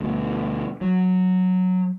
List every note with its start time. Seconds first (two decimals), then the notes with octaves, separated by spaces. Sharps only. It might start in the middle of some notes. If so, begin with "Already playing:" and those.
0.01 D2 B2
0.81 F#3